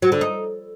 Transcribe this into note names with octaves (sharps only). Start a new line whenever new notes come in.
F#3
D3
D#4